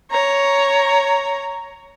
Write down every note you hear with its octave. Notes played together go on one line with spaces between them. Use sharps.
C#5 A#5